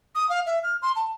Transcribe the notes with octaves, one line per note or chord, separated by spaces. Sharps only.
D#6
F5
E5
F6
C6
A5